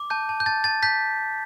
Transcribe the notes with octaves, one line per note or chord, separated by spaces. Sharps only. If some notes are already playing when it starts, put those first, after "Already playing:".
Already playing: D6
A5 G6
A5
G6
A5 A6
A5 A6
A5 G6 B6